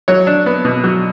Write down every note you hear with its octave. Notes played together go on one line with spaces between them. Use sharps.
F#3 C#5
D4
B3
B2
F#3